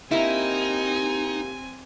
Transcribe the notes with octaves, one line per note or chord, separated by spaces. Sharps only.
A#3 C4 D#4 E4 G4 G#5